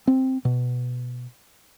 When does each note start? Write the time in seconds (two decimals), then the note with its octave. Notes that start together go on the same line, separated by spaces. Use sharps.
0.07 C4
0.45 B2